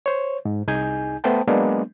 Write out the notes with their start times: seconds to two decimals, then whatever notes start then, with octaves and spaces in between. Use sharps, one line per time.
0.06 C5 C#5
0.45 G#2
0.67 C2 D#4 G#4 G#5 G6
1.24 A3 B3 B4 C5 G5 A5
1.47 F#3 G#3 A#3 B3 D4